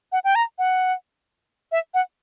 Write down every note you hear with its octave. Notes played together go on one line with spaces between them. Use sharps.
F#5
G5
A#5
F#5
E5
F#5